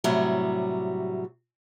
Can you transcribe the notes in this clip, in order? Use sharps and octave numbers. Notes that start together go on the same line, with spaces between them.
A2 C3 F#3 G3